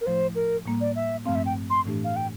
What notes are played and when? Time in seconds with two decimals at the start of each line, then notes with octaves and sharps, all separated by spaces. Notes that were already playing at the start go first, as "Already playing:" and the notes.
0.01 A#4
0.06 A2 F3 A3 E4 C5
0.35 A#4
0.65 A2 G3 A#3
0.81 D5
0.96 E5
1.25 G2 F3 A3 C4 F5
1.35 E5
1.46 G5
1.70 C6
1.85 A2 E3 A3 D4 G4
2.04 F5
2.16 G5